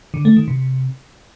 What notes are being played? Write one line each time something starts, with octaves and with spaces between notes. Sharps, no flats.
D3
A3
D#3
C3